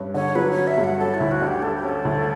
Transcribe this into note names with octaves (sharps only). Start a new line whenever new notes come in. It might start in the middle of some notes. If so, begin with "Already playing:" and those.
Already playing: G2 C#4
D3 C#5
F#3 B4
C#5
C#4
E5
G2
F#5
C#4 A4
E4
D2
F#4
D3
G4
G3 A4
G4
C#4 A4
D2